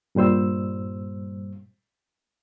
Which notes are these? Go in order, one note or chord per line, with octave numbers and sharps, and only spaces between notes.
G2 A#2 G3 C5 E6